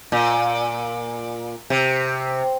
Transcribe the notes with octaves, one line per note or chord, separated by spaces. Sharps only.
A#2
C3